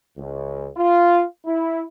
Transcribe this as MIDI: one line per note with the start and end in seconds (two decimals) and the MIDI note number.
0.18 0.69 37
0.77 1.23 65
1.45 1.81 64